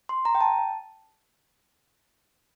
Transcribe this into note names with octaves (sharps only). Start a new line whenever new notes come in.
C6
A#5
G5
A5